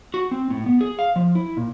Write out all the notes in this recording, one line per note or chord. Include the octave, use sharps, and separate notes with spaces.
F#4
C4
A2
B3
G#4
F5
F3
E4
A#2